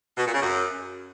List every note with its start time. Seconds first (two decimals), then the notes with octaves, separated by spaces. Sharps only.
0.17 B2
0.25 A#2
0.34 C#3
0.42 F#2